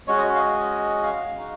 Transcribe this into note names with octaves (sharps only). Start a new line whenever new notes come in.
G#3 C#4 F#4 C#5
D#5
C#5
F5
D#5
F5
G#3 D#4 F#4